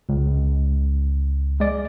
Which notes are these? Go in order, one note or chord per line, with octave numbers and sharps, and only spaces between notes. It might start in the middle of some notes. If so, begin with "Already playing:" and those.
C#2
G#3 D5